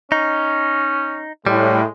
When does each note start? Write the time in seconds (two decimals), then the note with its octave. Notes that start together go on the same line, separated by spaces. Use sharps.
0.12 C#4 D#4
1.47 A2 G3 G#3